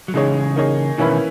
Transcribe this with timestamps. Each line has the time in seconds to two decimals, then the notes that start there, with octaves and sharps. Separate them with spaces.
0.08 F#3
0.14 C#3 E3 G#3 D#4 G#4 C#5
0.56 A#3 D#4 G#4 C#5
0.98 B2 D#3 E3 A#3 C#4 E4 B4